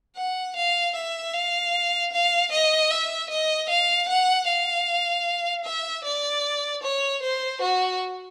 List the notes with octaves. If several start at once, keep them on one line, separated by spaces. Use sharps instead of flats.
F#5
F5
E5
F5
F5
D#5
E5
D#5
F5
F#5
F5
E5
D5
C#5
C5
F#4